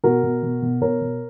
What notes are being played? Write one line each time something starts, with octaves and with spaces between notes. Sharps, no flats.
B2 F#4 A#4
B2
B2
B2
B2 A#4 C#5
B2